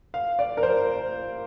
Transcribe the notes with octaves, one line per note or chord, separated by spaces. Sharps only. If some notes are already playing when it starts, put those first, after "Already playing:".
F5
D5
A#4
C5